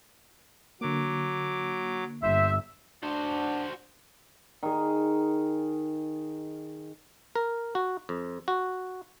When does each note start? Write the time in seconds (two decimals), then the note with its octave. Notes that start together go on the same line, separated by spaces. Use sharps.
0.81 D3 F#3 A#3 D6
2.23 G1 C5 E5
3.03 D4 F#4 C5
4.63 D#3 G#4
7.36 A#4
7.75 F#4
8.09 F2
8.48 F#4